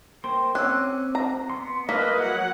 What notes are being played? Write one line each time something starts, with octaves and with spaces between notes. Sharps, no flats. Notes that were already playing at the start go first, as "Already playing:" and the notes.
A#3 C5 G5 C6
C4 C#4 D6 E6 F#6
A#5
B3 C6
A#3 E4 B4 D#5 F6 B6
F#3 F#5